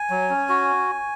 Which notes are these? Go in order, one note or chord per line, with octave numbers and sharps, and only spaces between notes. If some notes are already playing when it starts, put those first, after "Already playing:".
Already playing: G#5
F#3
C#4
F#4